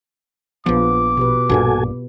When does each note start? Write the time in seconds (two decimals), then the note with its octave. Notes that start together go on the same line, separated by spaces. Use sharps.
0.66 A#1 F3 B3 F4 B4 D6
1.17 B2 G4 B4
1.49 A#1 G2 A#2 F#4 A4 G#5